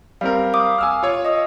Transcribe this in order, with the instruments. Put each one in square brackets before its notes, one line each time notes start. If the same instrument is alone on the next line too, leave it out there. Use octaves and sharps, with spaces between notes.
[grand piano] G3 C4 A#4 [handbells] F5
[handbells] F5 D6 D#6
[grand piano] G#5 E6 F6
F4 C#5
[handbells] D#5 D#6